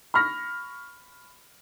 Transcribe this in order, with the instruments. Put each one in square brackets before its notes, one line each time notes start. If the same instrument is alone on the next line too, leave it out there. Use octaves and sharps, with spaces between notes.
[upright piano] B5 C#6 F6 A#6